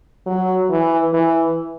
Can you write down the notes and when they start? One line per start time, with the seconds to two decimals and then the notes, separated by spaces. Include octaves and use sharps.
0.26 F#3
0.70 E3
1.14 E3